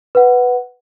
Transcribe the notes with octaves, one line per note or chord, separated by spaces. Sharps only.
B4 F#5